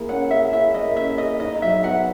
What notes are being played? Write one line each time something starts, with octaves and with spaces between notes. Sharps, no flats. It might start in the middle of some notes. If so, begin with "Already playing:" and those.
Already playing: A#3 E4 G#4
C#4 F#5
G#4 E5
E4 E5
A#3 D#5
C#4 E5
G#4 D#5
D#4 D#5
F#3 E5
B3 F#5